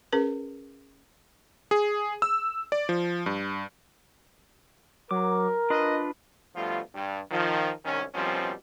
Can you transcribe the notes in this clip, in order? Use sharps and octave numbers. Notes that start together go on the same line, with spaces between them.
C#4 G#4 A#4 B4
G#4
E6
D5
F3
G2
F#3 A#4 D6
D4 F4 B4 D#5
G2 B2 F3 A3 F4
G2
D#3 F3
C2 G#2 D#3 C#4
B2 D#3 F3 G3 C4 C#4